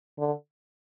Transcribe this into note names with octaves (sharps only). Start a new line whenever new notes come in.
D3